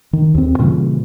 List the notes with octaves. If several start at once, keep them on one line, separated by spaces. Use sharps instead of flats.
D#3
D#2 C4
A#2 C#3 E3 G3